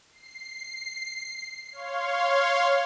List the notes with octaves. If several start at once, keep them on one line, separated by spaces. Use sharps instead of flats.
C7
C#5 F5 C6